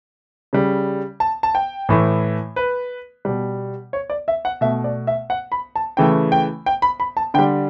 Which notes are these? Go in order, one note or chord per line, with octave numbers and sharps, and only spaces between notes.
C#3 G3
A5
A5
G5
A2 E3 A3
B4
B2 G3
C#5
D5
E5
F#5
B2 A3 E5
D5
E5
F#5
B5
A5
C#3 E3 A3 G5
G5
G5
B5
B5
A5
D3 G3 G5